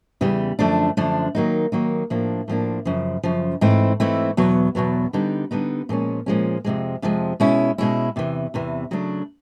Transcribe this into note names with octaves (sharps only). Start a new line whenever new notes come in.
E2 C#3 E3 G3
F#2 D3 F3 A3 D4
F#2 D3 F3 A3 D4
D#3 F#3 A#3 D#4
D#3 F#3 A#3 D#4
A2 F3 A#3 D4
A2 F3 A#3 D4
F#2 C#3 F3
F#2 C#3 F3
G#2 E3 A3 C4 E4
G#2 E3 A3 C4 E4
E2 B2 F#3 B3
E2 B2 F#3 B3
D3 G3 B3 D#4
D3 G3 B3 D#4
A#2 F3 G#3 C#4
A#2 F3 G#3 C#4
F2 C3 F3 G#3
F2 C3 F3 G#3
B2 G#3 C#4 E4
B2 G#3 C#4 E4
E2 C3 E3
E2 C3 E3
C#3 F#3 A3 D4